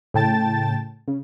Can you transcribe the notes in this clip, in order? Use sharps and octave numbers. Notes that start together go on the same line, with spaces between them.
A2 C#3 G5 A5 A6
C#3